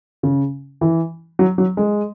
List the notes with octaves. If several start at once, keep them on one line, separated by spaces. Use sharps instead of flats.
C#3
E3
F#3
F#3
G#3